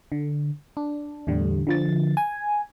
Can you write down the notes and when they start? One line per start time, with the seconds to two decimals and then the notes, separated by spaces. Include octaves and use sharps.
0.12 D3
0.77 D4
1.27 E2 A2 D3 G3
1.67 D3 F3 A6
2.17 G#5